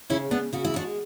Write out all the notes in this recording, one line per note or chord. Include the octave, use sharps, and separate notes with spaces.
C#3 C#4 E4
C#3 B3 D4
C#3 F#4
E4
G#3 D4 F#4